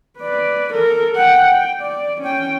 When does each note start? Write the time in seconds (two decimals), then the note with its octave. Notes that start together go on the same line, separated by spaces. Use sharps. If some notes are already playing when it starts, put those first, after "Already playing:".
0.18 B4 D5
0.73 A4 A#4
1.16 F#5 G5
1.48 G5
1.81 D5
2.21 C#4 G5